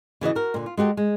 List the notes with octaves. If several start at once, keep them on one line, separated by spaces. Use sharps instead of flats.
C#3 E3 F#4 D#5
F#4 A#4
A#2 D3
F4
G#3 F#4 G4 A4
G#3